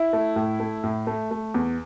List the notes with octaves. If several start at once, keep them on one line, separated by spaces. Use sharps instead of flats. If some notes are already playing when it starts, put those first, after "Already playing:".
Already playing: E4
A3
A2
A3
A2
A3
A3
E2